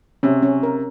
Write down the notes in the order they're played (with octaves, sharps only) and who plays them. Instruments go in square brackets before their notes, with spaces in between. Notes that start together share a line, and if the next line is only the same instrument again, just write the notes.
[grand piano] C3 [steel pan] C#4
[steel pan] C#4
A#4